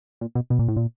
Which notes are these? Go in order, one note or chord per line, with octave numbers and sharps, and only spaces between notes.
A#2
B2
B2
A#2
A2
A#2